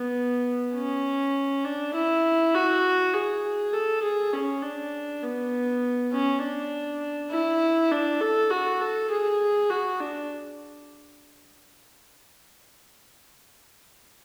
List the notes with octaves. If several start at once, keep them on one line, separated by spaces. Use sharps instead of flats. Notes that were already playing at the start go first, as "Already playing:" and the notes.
Already playing: B3
C#4
D4
E4
F#4
G#4
A4
G#4
C#4
D4
B3
C#4
D4
E4
D4
A4
F#4
A4
G#4
F#4
D4